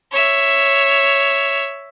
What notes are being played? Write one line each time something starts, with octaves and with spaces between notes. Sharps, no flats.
C#5 E5